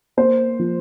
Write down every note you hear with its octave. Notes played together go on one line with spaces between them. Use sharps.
A#3 C5
F3